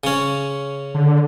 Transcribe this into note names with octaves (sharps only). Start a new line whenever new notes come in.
C#3 C#4
D3